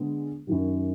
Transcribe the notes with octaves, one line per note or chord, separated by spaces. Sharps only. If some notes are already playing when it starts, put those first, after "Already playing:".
Already playing: D3 G#3 B3
F#2 D#3 F#3